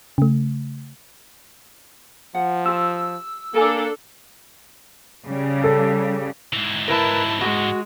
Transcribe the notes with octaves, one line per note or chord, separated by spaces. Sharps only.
C#3 A3
F3 F#5
F4 G4 E6
A#3 D4 A4 A#4 G#5 A#5
C#3 G3
A4
G#2 E3
E4 A#4 B4 A5
G#3 F#4